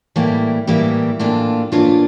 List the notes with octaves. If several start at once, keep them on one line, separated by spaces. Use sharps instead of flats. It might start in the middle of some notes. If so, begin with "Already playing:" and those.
A2 E3 G3 A#3 E4
A2 E3 G3 A#3 E4
A2 E3 A#3 D4 F4
A2 E3 A#3 D4 F4